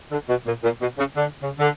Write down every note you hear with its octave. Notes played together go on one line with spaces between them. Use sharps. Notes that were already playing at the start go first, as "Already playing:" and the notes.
D3
B2
A#2
A#2
B2
C#3
D3
C#3
D3